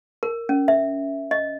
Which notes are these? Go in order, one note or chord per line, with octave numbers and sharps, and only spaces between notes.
A#4
C#4
E5
D#5